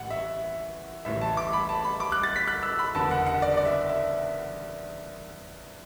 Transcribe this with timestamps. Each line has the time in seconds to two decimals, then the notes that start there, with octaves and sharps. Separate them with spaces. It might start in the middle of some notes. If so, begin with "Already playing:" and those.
Already playing: A1 A2 E3 F#5
0.10 E5
1.05 A1 A2 E3 E5
1.21 A5
1.37 D6
1.53 B5
1.69 A5
1.84 B5
2.00 D6
2.12 F#6
2.23 A6
2.36 B6
2.48 F#6
2.63 E6
2.79 B5
2.95 F#1 E2 D3 A5
3.11 F#5
3.26 F#5
3.42 D5
3.57 D5
3.65 E5
3.89 E5